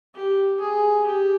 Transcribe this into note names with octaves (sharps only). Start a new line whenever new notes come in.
G4
G#4
G4